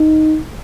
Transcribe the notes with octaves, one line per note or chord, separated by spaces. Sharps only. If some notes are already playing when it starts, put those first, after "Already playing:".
Already playing: D#4